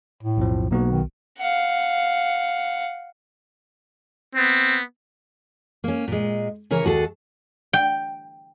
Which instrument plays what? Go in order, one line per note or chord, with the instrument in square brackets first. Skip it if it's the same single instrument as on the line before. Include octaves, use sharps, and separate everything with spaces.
[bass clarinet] A2
[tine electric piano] B1 F2 F3
[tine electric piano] B1 B3 F#4 [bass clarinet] A#3
[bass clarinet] D#3
[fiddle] F5 F#5
[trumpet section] B3 C4
[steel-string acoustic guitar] A#3 C#4
A#2 G#3
C#3 E3 A#4 C#5
D#2 F#4 G#4 A4
[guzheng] G5